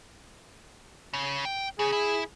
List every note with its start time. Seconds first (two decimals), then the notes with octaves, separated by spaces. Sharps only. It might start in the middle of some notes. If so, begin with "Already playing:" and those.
1.14 C#3
1.45 G5
1.79 C#3 G#4
1.92 E4